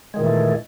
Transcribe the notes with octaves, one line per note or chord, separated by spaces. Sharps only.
A#2 D#3 E3 G#3 A3